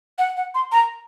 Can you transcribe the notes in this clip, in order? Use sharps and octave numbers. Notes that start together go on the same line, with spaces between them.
F#5
F#5
C6
A#5